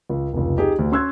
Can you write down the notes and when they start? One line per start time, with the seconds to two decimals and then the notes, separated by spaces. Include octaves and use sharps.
0.09 C#2
0.33 F1 C#2
0.57 D#4 G4 G#4
0.79 D2
0.92 C#4 C6 E6 F#6 G#6